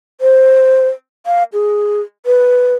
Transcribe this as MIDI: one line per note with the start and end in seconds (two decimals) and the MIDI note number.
0.21 0.88 72
1.26 1.43 77
1.53 2.01 68
2.26 2.75 71